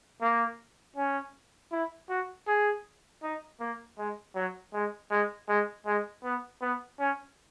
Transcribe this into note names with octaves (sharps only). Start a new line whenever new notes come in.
A#3
C#4
E4
F#4
G#4
D#4
A#3
G#3
F#3
G#3
G#3
G#3
G#3
B3
B3
C#4